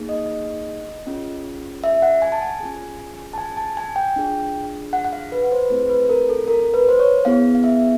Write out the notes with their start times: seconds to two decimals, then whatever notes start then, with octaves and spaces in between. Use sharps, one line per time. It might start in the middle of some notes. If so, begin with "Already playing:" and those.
Already playing: A#3 D#4 G#4
0.09 D#5
0.28 D#5
1.07 C#4 F4 G#4
1.84 E5
2.02 F#5
2.22 G#5
2.32 A5
2.42 G#5
2.60 C#4 F4 G#4
3.33 A5
3.38 G#5
3.57 A5
3.77 G#5
3.96 G5
4.16 D4 F4 G#4
4.93 F#5
5.04 F#5
5.13 F5
5.32 B4
5.52 C5
5.66 B4
5.70 A3 C4 E4 G#4 C5
5.89 B4
6.09 A#4
6.29 A4
6.48 A#4
6.74 B4
6.89 C5
6.99 C#5
7.25 B3 E4 G#4 F5
7.55 F5
7.64 E5